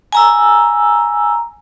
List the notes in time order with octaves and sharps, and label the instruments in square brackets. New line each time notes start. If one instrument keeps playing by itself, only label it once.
[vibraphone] G#5 A#5 E6